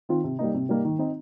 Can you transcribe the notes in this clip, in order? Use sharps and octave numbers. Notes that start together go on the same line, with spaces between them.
D#3 C4 F4
C3
G3 A#3 D#4
C3
G3 A#3 D#4
D#3
C4 D#4